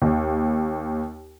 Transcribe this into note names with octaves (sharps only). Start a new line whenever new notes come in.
D#2